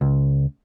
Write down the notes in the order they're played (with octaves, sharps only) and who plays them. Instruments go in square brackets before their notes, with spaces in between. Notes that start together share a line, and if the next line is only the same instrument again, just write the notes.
[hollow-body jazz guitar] C#2